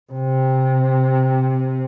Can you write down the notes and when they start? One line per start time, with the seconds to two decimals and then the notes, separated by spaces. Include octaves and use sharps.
0.12 C3